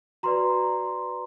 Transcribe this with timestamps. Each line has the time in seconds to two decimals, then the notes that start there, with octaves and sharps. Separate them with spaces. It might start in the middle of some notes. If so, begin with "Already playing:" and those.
0.23 F#4 B4 D5 A#5 C6